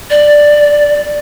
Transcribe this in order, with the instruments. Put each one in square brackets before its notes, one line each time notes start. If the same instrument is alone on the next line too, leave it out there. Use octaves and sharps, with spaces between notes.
[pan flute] D5